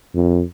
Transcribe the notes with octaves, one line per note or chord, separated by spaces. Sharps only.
F2